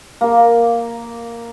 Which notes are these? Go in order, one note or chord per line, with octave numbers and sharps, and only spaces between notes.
A#3 A#4